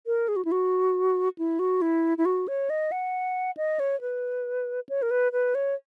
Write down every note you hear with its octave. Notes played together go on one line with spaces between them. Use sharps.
A#4
G#4
F#4
E4
F#4
E4
F#4
E4
E4
F#4
C#5
D#5
F#5
D#5
C#5
B4
C#5
A#4
B4
B4
C#5